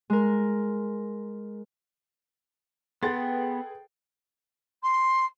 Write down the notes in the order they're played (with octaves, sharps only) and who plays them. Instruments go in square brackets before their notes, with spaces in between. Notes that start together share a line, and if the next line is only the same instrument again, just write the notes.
[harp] G#3 A#4
[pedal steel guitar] B3 [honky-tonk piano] G#4 A4 B4 [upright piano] F#5 C6 A6 [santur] G5
[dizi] C6